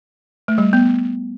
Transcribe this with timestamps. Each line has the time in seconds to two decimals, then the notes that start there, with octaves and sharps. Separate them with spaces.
0.48 A3
0.58 G3
0.73 B3